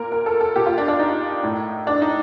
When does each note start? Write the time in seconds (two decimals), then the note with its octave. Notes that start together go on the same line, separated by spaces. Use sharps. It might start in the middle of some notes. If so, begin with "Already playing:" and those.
Already playing: A#2 A#4
0.12 A#4
0.26 A4
0.41 A4
0.56 A#2 G4
0.66 F4
0.78 D4
0.88 D4
0.99 D#4
1.43 A2
1.87 D4
2.02 D#4